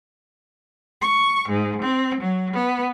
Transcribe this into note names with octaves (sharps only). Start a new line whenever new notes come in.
C#6
G#2
C4
F#3
B3